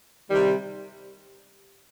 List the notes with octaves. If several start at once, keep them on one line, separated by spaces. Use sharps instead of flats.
C3 D#3 G3